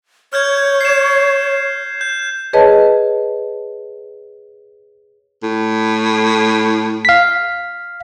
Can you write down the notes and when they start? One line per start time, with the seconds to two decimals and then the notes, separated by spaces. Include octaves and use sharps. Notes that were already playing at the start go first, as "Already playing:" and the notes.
0.33 C#5 F6 G6 G#6
0.81 C7 E7
2.01 G6
2.53 G#4 B4 C#5 D#5 A5
5.43 A2
7.05 F5 B6